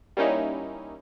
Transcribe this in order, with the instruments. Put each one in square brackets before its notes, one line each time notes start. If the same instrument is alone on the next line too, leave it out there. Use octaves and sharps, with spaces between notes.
[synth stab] G3 A#3 C#4 D#4 E4